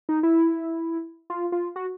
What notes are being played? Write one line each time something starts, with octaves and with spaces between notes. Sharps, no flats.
D#4
E4
F4
F4
F#4